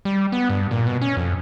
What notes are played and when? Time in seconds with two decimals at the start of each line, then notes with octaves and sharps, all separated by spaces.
0.05 G3
0.32 B3
0.50 G2
0.71 A#2
0.87 B2
1.02 C#4
1.17 F2